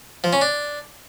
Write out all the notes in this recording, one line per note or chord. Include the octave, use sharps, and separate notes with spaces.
F3
C#4
D4